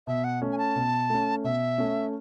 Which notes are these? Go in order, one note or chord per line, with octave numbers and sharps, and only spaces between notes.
B2 E5
F#5
A3 C#4
G#5
A5
B2
A3 C#4
B2 E5
A3 C#4